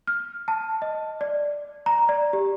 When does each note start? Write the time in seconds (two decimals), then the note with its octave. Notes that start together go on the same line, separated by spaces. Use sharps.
0.07 F6
0.48 A5
0.82 D#5
1.21 D5
1.86 A#5
2.09 D5
2.33 G4